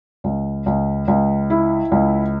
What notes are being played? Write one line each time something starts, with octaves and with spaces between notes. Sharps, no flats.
C#2
C#2
C#2
E4
C#2